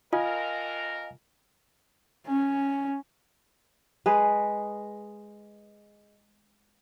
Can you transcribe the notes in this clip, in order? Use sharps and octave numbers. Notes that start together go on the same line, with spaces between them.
F2 F4 A#4 D#5 F5 G#5
C#4
G#3 G#4 B4